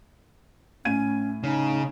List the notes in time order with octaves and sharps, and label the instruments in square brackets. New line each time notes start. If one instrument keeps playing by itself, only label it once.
[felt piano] A2 G#6 D#7 [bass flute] C#4
[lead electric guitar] C#3 [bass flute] D#4